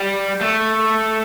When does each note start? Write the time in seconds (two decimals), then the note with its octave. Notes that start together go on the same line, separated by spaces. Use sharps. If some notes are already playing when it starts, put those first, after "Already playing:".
Already playing: G3
0.41 A3